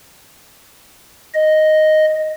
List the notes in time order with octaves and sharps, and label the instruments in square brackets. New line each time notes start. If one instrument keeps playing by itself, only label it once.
[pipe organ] D#5